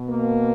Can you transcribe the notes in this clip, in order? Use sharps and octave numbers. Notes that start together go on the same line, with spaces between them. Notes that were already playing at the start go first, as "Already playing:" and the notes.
Already playing: B2
A#3